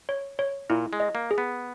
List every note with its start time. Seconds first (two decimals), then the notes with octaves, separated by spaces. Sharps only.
0.09 C#5
0.39 C#5
0.70 A#2 E4
0.93 G#3
1.00 D#5
1.15 A#3
1.31 G#4
1.38 B3